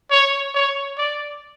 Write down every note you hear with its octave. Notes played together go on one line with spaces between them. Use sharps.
C#5
C#5
D5